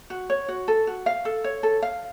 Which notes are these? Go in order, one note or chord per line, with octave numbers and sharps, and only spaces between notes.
F#4
C#5
F#4
A4
F#4
F5
A4
C#5
A4
F5